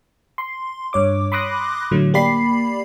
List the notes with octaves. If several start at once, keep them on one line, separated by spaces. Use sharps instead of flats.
C6
G2 C#5 D6
B5 C6 D6 D#6 F#6 A#6
A2 D3 F#3 A3
A#3 G4 D5 B5 C7